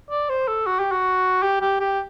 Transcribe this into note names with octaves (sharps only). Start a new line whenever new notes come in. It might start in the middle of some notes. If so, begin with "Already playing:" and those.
D5
C5
A4
F#4
G4
F#4
G4
G4
G4